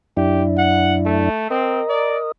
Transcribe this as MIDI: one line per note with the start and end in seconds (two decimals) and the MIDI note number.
0.17 1.29 42
0.17 1.29 62
0.17 1.29 64
0.17 0.43 67
0.58 0.97 78
1.05 1.47 57
1.50 1.81 60
1.50 2.32 70
1.50 2.32 75
1.89 2.18 74